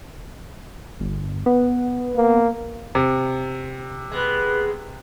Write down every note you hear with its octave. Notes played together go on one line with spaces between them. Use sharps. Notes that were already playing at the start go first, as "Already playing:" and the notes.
G1
B3
A#3
C3
G#3 B3 B4